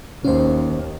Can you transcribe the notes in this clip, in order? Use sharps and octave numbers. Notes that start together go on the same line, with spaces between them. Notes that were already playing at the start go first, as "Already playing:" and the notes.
D#2 C#4 C5